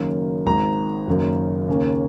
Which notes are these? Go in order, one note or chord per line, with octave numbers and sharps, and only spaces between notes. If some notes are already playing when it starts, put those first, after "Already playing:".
Already playing: F#1 F#2 D#3 A#3
G#1 G#2 D#3 A#5
F#1 F#2 D#3 A#3
D#2 C#3 A#3 C#4